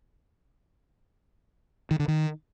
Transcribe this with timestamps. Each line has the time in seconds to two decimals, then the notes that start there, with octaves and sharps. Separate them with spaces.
1.91 D#3
1.99 D3
2.08 D#3